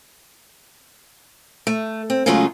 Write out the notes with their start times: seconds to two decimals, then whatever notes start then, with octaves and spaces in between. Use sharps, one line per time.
1.67 A3
2.10 C4
2.26 C#3 F#3 G#3 A3 C#4 F4